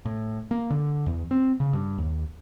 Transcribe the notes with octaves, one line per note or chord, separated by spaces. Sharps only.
A2
A#3
D3
E2
C4
C#3
G2
D#2